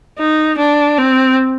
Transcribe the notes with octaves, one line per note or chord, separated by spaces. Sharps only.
D#4
D4
C4